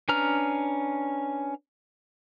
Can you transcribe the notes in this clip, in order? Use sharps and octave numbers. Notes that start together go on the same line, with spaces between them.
C#4 D4 B4 A#5 F6